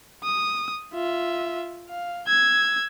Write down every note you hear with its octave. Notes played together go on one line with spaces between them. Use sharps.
D#6
F4 E5
F5
E6 G#6